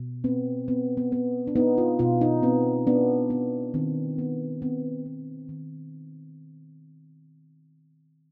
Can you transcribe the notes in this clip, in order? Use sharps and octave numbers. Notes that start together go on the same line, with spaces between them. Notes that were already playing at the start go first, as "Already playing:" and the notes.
Already playing: B2
B3 C4
B3 C4
B3
B3
D4
B3 D#4
F4
B2 F4
D#4
B3 C4
B3 D4
B3
D#3 C4
B3
B3 C4
B3
D#3